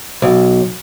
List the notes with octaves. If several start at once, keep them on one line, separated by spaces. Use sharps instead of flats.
B1